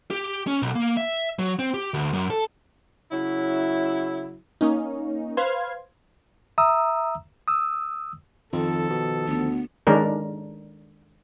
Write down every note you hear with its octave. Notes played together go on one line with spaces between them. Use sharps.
G4
C#4
B1
A#3
E5
F#3
C4
G4
D2
F#2
A4
C#3 F#3 E4
A#3 C#4 D#4
B4 C5 F5 C6 G#6
E5 A#5 D#6 E6
D#6 E6
F2 D#3 F3 A4
B2
D2 B3
D#3 G#3 C#4 D4 A#4